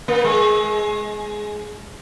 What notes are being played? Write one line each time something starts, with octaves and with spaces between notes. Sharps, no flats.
A#3
G#3